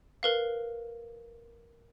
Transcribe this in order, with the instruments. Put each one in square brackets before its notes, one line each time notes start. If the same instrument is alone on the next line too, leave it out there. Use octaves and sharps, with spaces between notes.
[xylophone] A#4 B4 F5